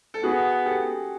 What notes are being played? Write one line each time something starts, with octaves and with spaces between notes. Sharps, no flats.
A4
B3 F#4 G#4
G4 A4